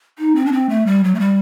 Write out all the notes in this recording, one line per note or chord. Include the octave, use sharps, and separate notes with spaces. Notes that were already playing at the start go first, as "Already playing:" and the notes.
D#4
C4
D4
C4
A3
G3
F#3
A3
G3